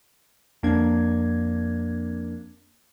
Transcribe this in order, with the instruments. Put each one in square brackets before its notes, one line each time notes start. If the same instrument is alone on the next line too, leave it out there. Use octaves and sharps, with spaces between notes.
[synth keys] F2 A#3 D4 G#6